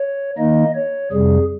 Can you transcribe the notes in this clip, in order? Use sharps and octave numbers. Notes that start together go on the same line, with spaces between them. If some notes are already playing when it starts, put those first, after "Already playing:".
Already playing: C#5
D#3 A#3 D#4 D#5
C#5
F2 C3 G3 G#4